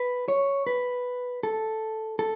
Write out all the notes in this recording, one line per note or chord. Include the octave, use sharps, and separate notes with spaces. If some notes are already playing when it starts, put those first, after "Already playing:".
Already playing: B4
C#5
B4
A4
A4